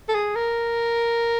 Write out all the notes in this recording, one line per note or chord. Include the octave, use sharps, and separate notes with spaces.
A4
G#4
A#4